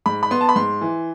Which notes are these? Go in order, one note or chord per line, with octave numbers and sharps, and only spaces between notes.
G#2 B5
B5
B3 C6
A5
B5
G#2 C6
E3